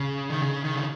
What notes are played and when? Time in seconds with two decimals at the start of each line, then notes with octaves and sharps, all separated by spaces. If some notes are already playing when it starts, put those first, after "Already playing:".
Already playing: C#3
0.30 D#3
0.42 C#3
0.64 D#3
0.75 C#3